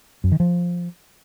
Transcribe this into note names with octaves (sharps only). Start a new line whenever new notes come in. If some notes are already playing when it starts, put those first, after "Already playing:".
F#2
D#3
F3